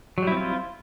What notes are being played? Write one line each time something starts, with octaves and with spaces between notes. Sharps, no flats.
F#3 G3 C4 E4 F4